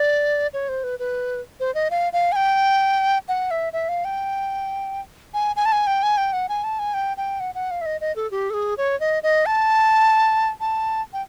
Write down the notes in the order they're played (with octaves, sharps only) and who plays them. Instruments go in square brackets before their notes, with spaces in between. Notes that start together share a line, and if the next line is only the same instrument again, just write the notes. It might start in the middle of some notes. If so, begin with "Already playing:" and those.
Already playing: [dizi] D5
C#5
C5
B4
B4
C5
D#5
F5
F5
G#5
G5
F#5
E5
E5
F5
G5
G#5
G#5
A5
G#5
G5
G#5
G5
F#5
G#5
A5
G#5
G5
G5
F#5
F#5
F5
E5
D#5
D#5
A4
G4
A4
G#4
C#5
D#5
D#5
A5
A5
G5